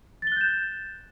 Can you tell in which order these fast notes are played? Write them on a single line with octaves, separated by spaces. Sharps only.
A6 G7 F#6 G6 E7